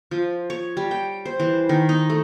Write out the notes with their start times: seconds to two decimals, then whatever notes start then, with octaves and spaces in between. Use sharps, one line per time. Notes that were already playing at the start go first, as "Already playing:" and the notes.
0.11 F3
0.50 C#5
0.77 G3
0.91 G5
1.25 C5
1.40 E3
1.69 D#3
1.89 D#4
2.10 A3